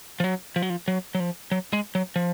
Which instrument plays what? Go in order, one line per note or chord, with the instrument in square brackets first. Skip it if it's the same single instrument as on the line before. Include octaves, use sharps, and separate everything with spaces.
[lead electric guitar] F3
F#3
F3
F#3
F3
F#3
F#3
F3
F#3
G#3
F#3
F3